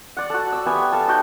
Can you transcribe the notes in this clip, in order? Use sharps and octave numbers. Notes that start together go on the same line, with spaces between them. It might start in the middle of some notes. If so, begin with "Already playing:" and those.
D5 F#5
F#4 A4
E6
B3 G4 E5 G#5
A4 F5 A5
D#4 F#4 G5